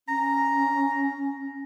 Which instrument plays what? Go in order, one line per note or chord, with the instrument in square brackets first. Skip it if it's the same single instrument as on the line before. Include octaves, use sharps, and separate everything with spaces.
[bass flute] C#4 [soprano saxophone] A#5